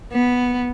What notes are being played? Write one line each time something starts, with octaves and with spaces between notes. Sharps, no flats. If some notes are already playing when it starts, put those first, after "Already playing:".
B3